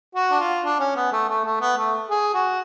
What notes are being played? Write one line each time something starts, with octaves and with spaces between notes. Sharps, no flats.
F#4
D4
F4
D4
C#4
B3
A3
A3
A3
B3
A3
G#4
F#4